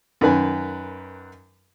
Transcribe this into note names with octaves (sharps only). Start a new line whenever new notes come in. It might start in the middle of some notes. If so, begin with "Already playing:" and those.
F#2 D#3 B4 G#5